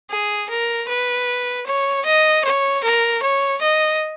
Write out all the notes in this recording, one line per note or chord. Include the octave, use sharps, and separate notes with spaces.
G#4
A#4
B4
C#5
D#5
C#5
A#4
C#5
D#5